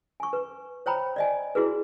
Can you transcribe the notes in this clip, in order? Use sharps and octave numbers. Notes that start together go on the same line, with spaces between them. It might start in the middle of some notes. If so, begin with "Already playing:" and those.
G#5 C#6
B4
C5 C#5 G5 A#5 B5
D5 D#5 G#5
E4 F#4 G#4 B4